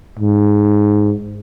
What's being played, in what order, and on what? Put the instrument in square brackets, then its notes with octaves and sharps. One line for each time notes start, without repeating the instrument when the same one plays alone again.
[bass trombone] G#2